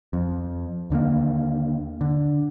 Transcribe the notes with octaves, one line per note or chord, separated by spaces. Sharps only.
F2
D#2 D3 D#3 A#3
D3